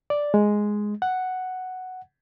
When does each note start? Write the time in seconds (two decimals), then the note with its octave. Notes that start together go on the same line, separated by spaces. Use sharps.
0.10 D5
0.34 G#3
1.02 F#5